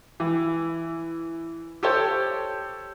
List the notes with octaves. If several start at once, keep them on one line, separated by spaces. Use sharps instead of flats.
E3
G4 A4 C5 C#5